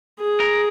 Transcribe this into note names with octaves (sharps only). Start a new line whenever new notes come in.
G#4
A#4